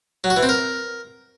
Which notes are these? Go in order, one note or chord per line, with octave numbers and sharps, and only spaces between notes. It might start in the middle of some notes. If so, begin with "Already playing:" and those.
F#3
F#4
E3
C4
A#4